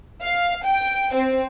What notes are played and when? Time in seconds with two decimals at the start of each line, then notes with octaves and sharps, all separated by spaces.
0.23 F5
0.66 G5
1.15 C4